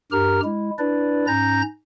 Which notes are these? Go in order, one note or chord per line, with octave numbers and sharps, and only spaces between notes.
G2 G4 A#4 A#5 F6
G#3 E4
D4 E4 B4 D5
G#2 C#4 A#5 G6 A#6